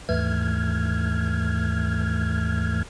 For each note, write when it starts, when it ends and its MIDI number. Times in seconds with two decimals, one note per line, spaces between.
0.09 2.83 39
0.09 2.83 44
0.09 2.83 52
0.09 2.83 57
0.09 2.83 89
0.09 2.83 92